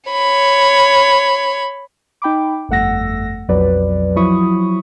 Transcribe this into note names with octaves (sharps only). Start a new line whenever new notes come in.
C#5 B5
D#4 G5 B5 D6
G1 F2 A3 F#5 E6 A#6
B1 F2 F#3 B4 D5
F3 F#3 E4 B5 C#6 D#6